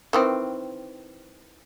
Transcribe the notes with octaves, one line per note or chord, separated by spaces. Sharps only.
D#3 E3 C4